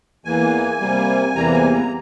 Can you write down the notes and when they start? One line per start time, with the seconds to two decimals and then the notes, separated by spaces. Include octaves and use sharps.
0.25 E2 E3 A#3 G#5
0.80 C3 G3 A#3
1.35 E2 C3 E3 G3 A#3 A#5
1.54 G#5
1.73 A#5